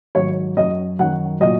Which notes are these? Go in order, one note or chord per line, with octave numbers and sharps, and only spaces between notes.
G#2 D#3 F#3 C#5
F#2 F#3 D#5
F#2 D#3 F#3 F#5
A#2 F#3 D#5